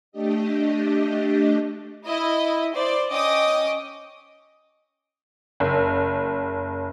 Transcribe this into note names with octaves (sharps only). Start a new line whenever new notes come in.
A3 D4 G4 D#5
E4 D#5
C5 D5
C#4 D#5 G5 D6 D#6
F#1